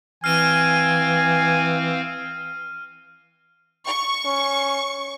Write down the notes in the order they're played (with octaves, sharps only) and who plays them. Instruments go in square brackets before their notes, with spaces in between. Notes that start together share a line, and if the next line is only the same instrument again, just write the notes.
[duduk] E3 [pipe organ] C4 F5 [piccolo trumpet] G#5 [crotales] F6 D#7
[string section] C#6
[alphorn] C#4